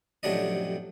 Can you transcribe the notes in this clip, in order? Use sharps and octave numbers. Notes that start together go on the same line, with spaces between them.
A1 F2 C3 F#3 D4 D#5